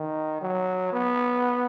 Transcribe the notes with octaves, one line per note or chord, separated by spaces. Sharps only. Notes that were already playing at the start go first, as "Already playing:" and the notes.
Already playing: D#3
F#3
B3